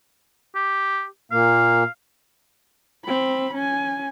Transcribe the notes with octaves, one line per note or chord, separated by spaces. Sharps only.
G4
A#2 A#3 F5
C4 B5
C#4 G#5